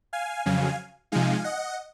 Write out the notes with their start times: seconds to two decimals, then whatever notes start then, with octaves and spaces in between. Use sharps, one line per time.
0.13 F5 G#5
0.46 F2 C#3 F#3 F5 G#5
1.12 C3 F3 G#3 D#4 F5 G#5
1.44 D#5 F#5